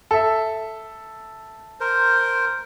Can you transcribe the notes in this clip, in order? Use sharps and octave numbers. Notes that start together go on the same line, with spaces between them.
A4 E5
A#4 C5